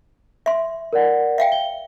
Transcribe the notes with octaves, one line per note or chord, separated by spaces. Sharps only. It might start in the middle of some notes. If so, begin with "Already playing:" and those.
E5 C6
A#4 D5 F#5
E5 F5 G5
G7